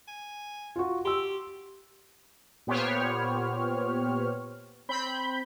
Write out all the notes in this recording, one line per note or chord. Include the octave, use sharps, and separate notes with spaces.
G#5
F4 F#4
G4 C6 E6
A#2 B3 G4 C5 C#5 F6
C4 B5 G6